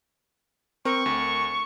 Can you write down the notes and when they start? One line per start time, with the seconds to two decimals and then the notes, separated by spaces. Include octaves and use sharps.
0.85 C4 A#4 C#6
1.06 D2